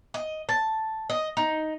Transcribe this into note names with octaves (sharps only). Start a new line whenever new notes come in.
D#5
A5
D#5
D#4